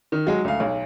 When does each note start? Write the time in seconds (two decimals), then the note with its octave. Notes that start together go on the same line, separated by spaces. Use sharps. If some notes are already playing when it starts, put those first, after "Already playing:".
0.12 D#3
0.27 F#3 G#3
0.45 D2 F5
0.60 B1